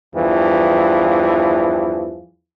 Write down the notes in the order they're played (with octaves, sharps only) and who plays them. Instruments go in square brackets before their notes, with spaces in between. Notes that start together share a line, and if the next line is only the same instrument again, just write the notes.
[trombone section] E2 G2 E3 F3